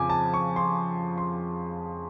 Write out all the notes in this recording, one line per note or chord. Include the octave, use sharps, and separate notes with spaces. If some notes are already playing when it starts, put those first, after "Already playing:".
Already playing: F2 C#3 G#5 D6
A5
C#6
C6
C6